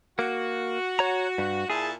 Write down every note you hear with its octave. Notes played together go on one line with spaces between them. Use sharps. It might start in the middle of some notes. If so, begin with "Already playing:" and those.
A#3 F#4
C#5 A#5
G2
A#2 E4 G#4 A5